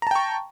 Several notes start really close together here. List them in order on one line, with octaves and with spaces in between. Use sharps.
A#5 A5 G5 C#6